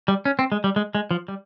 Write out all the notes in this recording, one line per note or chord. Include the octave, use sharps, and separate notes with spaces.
G3
C#4
C4
G#3
G3
G#3
G#3
F3
G3